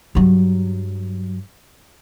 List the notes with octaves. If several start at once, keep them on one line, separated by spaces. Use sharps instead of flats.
G2 F#3